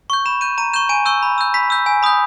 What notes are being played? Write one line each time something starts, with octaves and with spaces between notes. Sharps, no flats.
C#6 G6
B5 E7
G6 D#7
A#5 D#7
C#6 G6 E7
G#5 D#7
C#6 E6 G6
B5
E6 G6
B5 B6
E6 G6
G#5
B5 D#6 G6